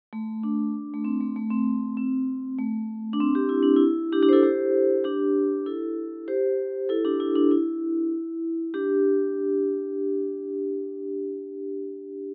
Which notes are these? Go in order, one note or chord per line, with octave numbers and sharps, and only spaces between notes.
A3
D4
A3
C4
A3
A3
C4
C4
A3
D4
C4
G4
E4
D4
E4
D4 G4
D4 G4
C5
E4 A4
G4 C5
D4 G4
E4 A4
G4 C5
E4 A4
D4 G4
E4
D4
E4
D4 G4